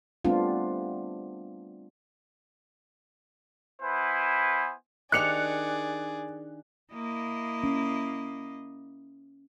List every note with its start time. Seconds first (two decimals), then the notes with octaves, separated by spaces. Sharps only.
0.24 G3 A3 B3 C4 D4 F4
3.82 B3 E4 B4 C5 G#5
5.12 D#3 D4 G4 G#4 D5 F#6 C#7 F7
6.93 A#3 E4 D#5
7.64 C#4